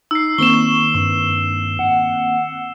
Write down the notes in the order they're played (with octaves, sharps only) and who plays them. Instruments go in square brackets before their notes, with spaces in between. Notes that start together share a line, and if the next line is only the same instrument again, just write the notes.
[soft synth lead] D#4 [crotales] E6 C7
[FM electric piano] D#3 A#3 C4 [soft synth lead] C#6 [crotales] E7 G7
[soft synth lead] G2
F#5